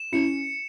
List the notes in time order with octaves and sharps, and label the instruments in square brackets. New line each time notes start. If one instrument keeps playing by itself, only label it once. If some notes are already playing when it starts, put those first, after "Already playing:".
Already playing: [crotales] E7
[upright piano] C#4 E4 [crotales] C#7